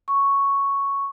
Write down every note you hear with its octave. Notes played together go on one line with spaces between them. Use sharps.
C#6